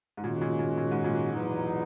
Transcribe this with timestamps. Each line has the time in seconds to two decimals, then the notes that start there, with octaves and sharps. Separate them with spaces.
0.17 G#2
0.23 A#2 D#3 G#3 C#4 F#4
0.41 A#2
0.59 A#2
0.77 A#2
0.91 G#2
1.04 A#2
1.33 E2 B2 F#3 B3 D#4